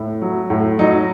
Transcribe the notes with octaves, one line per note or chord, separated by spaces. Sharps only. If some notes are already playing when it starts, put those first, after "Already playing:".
Already playing: A2
F#3
A2
F#3 D#4